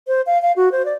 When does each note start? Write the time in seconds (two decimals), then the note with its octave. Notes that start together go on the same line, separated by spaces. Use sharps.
0.07 C5
0.26 F5
0.42 F5
0.56 F#4
0.72 C5
0.85 D5